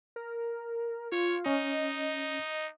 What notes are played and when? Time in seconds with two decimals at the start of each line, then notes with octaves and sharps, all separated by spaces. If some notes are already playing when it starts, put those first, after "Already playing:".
0.16 A#4
1.12 F4 C#5
1.46 C#4 D#4 D#5